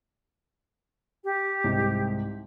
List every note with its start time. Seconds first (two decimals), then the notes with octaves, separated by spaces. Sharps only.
1.24 G4
1.64 C2 G#2